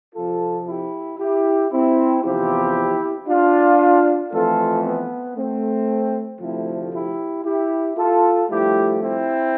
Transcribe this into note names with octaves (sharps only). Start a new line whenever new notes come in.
F2 C3 F3 F4 A4
E4 G4
E4 G4
C4 E4
E2 C3 F3 E4 G4
D4 F4
F2 E3 A3 F4 A4
B3
A3 C4
D2 C3 F3 A3 C4 E4
E4 G4
E4 G4
F4 A4
G2 F3 A3 E4 G4
C4 E4